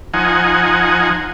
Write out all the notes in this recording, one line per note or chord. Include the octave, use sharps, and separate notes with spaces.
F3 D#4 F#5 G#5